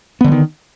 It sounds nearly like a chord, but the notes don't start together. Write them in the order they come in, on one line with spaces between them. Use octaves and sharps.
B3 D3 G3 D#3